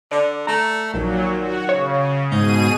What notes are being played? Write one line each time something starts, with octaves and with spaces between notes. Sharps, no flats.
D3 D5
A3 A#5
A#1 A#2 D#3 F#3
F#4
C#3 C#5
G#2 B2 D#4 G#4 D#7